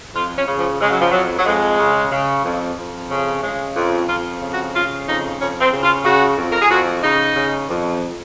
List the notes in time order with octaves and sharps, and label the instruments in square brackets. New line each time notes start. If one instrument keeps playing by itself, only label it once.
[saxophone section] F2 F4
C#4
C#3
F3
C#3 G#3
F#3
F3
F2 F#3
F#3
F2 G#3
C#3
C#3
F2
F2
C#3
C#3 G#3
F2
F2 F4
C#3
F#4
C#3 F4
F2 D#4
F2 C#4
C4
C#3
F4
C#3 F#4
F2
A#4
G#4
F2 F#4
C#3 D#4
C#3
F2